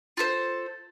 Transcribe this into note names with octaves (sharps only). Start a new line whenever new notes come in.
F4 A4 C5